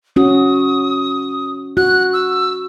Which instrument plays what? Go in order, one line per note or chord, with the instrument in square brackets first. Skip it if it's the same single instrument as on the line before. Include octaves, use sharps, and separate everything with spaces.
[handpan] C#4 F#4 [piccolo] D#6
[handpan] F#4 [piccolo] F#6
[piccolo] E6